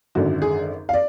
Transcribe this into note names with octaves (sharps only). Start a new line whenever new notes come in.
G#1 F#2 D3 F#4
G#4
F5
D5